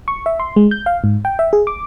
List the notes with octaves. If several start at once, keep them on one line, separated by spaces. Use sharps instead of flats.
C#6
E5
C6
G#3
G6
F5
G#2
G5
E5
G#4
D6